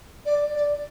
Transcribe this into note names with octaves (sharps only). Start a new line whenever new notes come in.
D5
D5